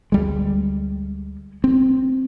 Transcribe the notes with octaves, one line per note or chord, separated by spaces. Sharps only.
D2 G3 G#3
C4